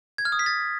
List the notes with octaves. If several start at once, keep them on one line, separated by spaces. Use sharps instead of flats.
G#6
F6
D#6
B6
A6